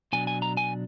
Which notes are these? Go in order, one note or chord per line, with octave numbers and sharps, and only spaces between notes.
B2 F#3 D4 G#5
G#5
A#5
G#5